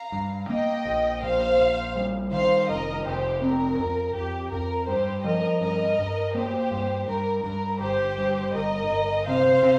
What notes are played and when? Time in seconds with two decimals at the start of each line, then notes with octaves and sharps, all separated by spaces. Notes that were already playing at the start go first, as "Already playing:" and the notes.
Already playing: F5 A#5
0.12 G2
0.49 A#3 D#5 G5
0.85 A#1
1.23 A#2 C5 F5
1.58 A#1
1.96 G3
2.31 D#3 C5 F5
2.68 F1 A#4 D#5
3.05 F1 G4 C5
3.42 C4 A#4
3.79 F2
4.14 F2 G4
4.51 F2 A#4
4.87 G2 G4 C5
5.24 F3 A#4 D#5
5.61 G2 A#4 D#5
5.98 G2
6.34 A#3 G4 C5
6.71 G2
7.08 G2 A#4
7.44 G2 A#4
7.80 G1 G4 C5
8.18 G2
8.54 G1 A#4 D#5
8.91 G1
9.26 C3 C5 F5
9.63 C3